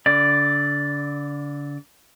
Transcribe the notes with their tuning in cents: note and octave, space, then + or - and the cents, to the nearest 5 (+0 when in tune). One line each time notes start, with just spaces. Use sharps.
D3 -35 D5 +0